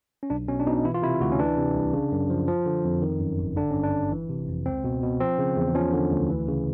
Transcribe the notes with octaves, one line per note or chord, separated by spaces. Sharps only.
C#4
B1 D4
B2 C#4
D4
B2 D#4
E3 E4
F4
C3 E4
D2 F#4
C#4
E3 D4
C3
C2
C#3
F#2
F3
F3
D3
F2
D#3
F#2
G#1
D3 D4
G2 C#4
D4
G1
E3
C3
F2
C#2 C4
B2
B2
F3 C4
C#3
E2
F3 C#4
D3
D2
E3
C#3